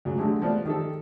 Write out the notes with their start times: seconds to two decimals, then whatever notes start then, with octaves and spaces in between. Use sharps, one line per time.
0.05 C#2 F#3
0.18 D3 F#3 G#3 A3 G4
0.42 F3 G3 A3 B3 C4 D5
0.65 D#3 G4 A4